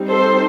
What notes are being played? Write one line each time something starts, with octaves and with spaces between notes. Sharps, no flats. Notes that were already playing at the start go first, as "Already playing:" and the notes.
Already playing: G3 C4 D#4
A4 C5